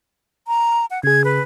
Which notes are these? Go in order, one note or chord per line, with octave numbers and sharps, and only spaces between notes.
A#5
F#5
C#3 G#4 G#6
B4